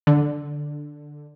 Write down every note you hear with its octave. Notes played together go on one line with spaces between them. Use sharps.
D3